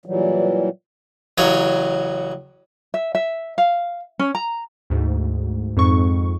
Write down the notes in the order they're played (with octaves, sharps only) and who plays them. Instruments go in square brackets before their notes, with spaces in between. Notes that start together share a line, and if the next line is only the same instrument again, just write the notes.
[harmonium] A#2 E3 F#3 G3
[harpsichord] A1 C#3 F#3 A#4 C#5
[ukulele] E5
E5
F5
C#4
A#5
[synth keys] D2 G#2
F2 G#2 C#6